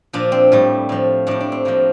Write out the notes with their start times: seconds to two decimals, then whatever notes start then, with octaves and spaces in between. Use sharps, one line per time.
0.13 A#2 F3 D4
0.32 C4
0.52 A2 G3
0.89 A2 F3
1.27 A2 G3 D4
1.40 D4
1.52 C4
1.65 A2 F3 A#3